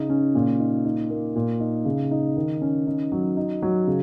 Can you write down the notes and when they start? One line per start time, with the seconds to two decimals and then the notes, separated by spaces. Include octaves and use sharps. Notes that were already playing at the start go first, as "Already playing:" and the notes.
Already playing: C#3 D#4
0.10 C#4
0.35 A#2
0.60 D#4
0.85 D#4
1.10 A#3
1.35 A#2
1.60 D#4
1.85 C#3
2.11 D#4
2.37 D#3
2.61 C#4
2.87 D#4
3.12 F#3
3.37 D#4
3.62 F#3
3.87 C#3